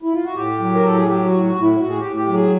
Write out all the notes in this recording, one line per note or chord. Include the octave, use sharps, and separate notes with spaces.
E4
F4
F#4
A2 G4
F#3
A#4
A2 A4
G#4
F#3 G4
F#4
A2
F#4
A2
E4
A2 F#4
G#4
G4
A2
G4
F#3
G#4